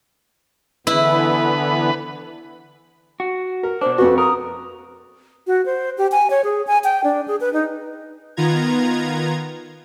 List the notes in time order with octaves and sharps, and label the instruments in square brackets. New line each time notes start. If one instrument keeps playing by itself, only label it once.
[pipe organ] D3 E3 B3 [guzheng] E4 [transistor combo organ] B4
[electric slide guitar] F#4
[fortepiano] A#4
[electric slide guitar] B2 D4 [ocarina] C5
[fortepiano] F2 F#4 [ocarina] B4
[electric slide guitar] A#4 [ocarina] D#6
[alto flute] F#4
C5
G4
G#5
C#5
G#4
G#5
G5
D4
G#4
B4
D#4
[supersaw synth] D#3 B3 F4 A#5 G#6